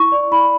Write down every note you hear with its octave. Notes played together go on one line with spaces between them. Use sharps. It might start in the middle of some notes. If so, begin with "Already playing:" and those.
Already playing: E4 C#6
D5
E4 B5